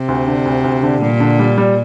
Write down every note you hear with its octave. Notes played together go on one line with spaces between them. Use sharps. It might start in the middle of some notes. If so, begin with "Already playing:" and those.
Already playing: C3
D2
D3
D2
D2
D3
A#2 G3
D3
G3
G3